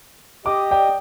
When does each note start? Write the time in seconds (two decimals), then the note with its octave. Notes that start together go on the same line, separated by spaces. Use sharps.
0.46 G4 D#5 D6
0.71 D5 G5